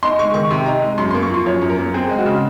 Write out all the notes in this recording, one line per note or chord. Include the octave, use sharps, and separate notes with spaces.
D#4 C6
G#3 C#6
D#3 C#6
C3 C6
D#4 A#5
G#3
F#2 C6
C6
A#3
C#6
F3 C6
F#2 C#5
F#2
A#4
A#3
C4 G#4
G#3
F#4
C#3